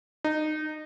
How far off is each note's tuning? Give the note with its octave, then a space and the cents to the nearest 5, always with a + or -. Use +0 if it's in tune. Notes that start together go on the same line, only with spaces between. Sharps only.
D#4 -20